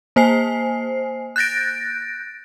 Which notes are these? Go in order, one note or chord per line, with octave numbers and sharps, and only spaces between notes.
A#3 C5 G#5 C7
F#6 G6 A6 A#6 D7